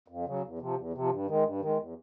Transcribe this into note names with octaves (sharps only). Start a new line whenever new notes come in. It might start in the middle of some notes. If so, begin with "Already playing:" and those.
F2
C#3 F#3
E2
C3 F3
E2
C3 F3
G2
D#3 G#3
G2
D#3 G#3
E2